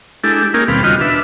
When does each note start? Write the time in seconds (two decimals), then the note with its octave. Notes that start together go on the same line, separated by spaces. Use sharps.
0.24 G#3 D4 E4 G4 A4
0.54 A#3 C#4 D#4 G4 G#4 A#4
0.68 D#2 B2 G3 C4 F5 B5
0.84 C#3 G3 F4 F#4 D#5 F6
1.01 D4 B4 E5